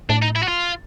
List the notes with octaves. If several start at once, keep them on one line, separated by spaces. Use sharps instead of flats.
A2 D4
D#4
E4
F#4
F4